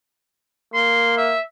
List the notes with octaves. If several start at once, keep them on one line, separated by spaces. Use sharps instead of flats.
A#3 C6
E5